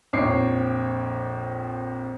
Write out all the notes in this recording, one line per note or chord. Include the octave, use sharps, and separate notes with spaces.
A#1 F2 C#5 D6 C7